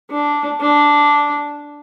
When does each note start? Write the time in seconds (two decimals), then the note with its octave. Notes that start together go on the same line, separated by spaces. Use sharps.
0.10 D4
0.61 D4